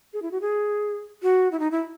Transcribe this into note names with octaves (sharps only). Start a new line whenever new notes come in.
G#4
E4
F#4
G#4
F#4
E4
D#4
E4